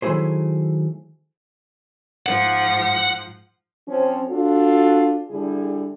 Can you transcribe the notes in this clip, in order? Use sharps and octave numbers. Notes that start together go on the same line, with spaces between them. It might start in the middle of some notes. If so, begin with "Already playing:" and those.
D#3 F#3 A3 E4 G#4 C5
G#2 F3 F#5
F3 C4 C#4
D4 F4 F#4 A4
D3 G3 E4 G#4